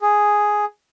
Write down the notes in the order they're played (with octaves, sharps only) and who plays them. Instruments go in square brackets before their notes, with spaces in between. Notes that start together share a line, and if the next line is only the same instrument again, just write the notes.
[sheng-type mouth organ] G#4